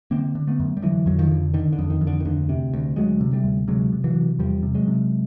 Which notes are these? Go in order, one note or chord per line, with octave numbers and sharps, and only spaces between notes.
D3 A#3 C4
D3
A3 B3
F#2
G3
D3 E3 F#3
F2 F#3
D#3 F3
D3
D3 D#3
D3
F2
D#3
F2
D3
D#3
D2 D3
C3
D2
D2 F#3 G#3
C3
G3 A3
D2
C3 F#3 G#3
C3
E3 F#3
C3
E2 F3 G3
C3
F#3 G#3
C3